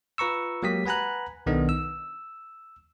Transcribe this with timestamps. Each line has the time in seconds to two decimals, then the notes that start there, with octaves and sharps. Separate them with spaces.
0.18 F4 B4 A#5 C#6 E6
0.63 F#3 G#3 A#3 G4 D#6 B6
0.86 B4 F#5 G#5 A#5 B5 F#6
1.46 B1 D#3 B3 D4 A4 D#5
1.69 E6